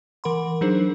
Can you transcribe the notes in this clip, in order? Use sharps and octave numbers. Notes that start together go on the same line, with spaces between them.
E3 A#4 F#5 B5 C6
F#3 D4 D#4 G#4 A#4 C5